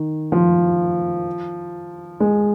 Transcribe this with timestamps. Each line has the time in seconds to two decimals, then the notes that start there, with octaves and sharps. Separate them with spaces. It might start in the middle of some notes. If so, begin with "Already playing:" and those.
Already playing: D#3
0.32 F3
2.20 G#3